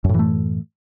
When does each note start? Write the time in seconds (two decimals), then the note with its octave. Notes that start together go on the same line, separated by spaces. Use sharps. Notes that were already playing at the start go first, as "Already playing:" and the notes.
0.04 F#2
0.09 A2
0.14 E3
0.19 A3